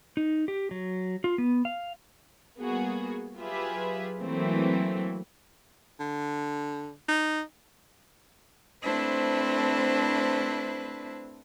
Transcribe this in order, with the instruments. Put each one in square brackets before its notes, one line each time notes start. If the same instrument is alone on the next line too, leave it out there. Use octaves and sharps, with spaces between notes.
[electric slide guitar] D#4
G4
F#3
F4
B3
F5
[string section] G3 A#3 B3 F#4 G#4
F#3 F4 G4 G#4 B4 E5
E3 F#3 A3 A#3 C4
[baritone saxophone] D3
D#4
[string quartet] A3 C4 D4 E4 B4 C5